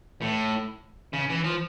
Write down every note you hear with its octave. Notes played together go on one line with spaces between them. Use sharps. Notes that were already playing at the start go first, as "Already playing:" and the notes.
A2
C#3
E3
F3